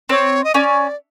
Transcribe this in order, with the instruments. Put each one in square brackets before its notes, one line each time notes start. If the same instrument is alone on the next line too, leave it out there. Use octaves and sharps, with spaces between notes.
[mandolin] C4 [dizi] C#5
[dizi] D#5
[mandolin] C#4 [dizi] D5